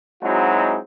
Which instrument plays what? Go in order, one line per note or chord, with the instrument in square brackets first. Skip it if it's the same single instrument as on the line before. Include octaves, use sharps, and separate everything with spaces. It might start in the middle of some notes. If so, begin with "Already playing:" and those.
[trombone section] F#3 G#3 C4 D#4 E4 F#4